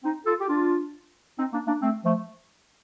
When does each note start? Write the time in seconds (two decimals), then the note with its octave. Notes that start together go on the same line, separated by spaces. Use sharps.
0.04 C4 D#4
0.26 F4 A4
0.40 G4
0.49 D4 F4
1.38 C4 D#4
1.53 A#3 D4
1.67 A#3 D4
1.82 A3 C4
2.05 F3 A3